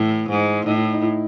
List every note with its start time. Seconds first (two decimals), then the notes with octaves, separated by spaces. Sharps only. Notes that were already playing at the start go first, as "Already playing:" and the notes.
Already playing: A2 E3
0.29 G#2
0.66 A2 D#4
0.75 E4
0.94 D#4
1.02 E4